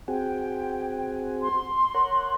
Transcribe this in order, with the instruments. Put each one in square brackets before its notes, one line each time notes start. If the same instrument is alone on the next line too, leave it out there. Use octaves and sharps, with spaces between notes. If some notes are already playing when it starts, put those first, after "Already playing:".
[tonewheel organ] C4 F#4 G#4 [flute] G5
[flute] C6
[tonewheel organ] A#4 C#5 F#5